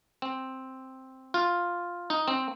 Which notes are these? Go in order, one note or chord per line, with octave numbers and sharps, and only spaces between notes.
C4
F4
D#4
C4